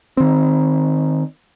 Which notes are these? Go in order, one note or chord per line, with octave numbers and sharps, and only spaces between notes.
D#3 C4